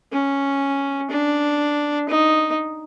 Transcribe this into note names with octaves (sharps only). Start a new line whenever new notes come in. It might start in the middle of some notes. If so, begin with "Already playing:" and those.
C#4
D4
D#4